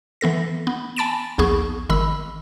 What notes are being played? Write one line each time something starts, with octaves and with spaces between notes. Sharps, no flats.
E3 B3 A4 A#6
B3
G#5 A5 B5 A6 D7 E7
A#1 D#2 B3 G#4 C#6
G#1 D#3 B5 E6